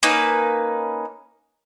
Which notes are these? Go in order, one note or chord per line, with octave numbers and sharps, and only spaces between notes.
A#3 C#4 D#4 B4